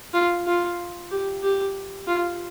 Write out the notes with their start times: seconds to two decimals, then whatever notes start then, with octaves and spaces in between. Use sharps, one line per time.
0.14 F4
0.46 F4
1.11 G4
1.43 G4
2.07 F4